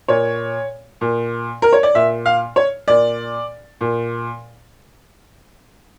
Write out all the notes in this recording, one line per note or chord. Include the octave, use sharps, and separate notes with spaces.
A#2 C#5
A#2
A#4
C#5
D5
A#2 E5
F5
C#5
A#2 D5
A#2